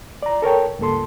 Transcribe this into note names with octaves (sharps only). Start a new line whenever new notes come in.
D5 A#5
A4 A#4 C#5 G5
C#2 G2 A#3 A4 C6